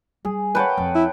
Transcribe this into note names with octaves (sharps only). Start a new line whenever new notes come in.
G3 G#4
B4 C#5 F#5 G5 A5
F2
E4